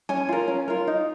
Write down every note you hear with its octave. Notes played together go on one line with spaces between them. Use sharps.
C#4 G#5
F4 A#4
C#4
F4 A#4
D#4